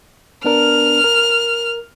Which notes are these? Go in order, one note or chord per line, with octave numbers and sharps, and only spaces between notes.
B3 D4 A#4 F6
A#4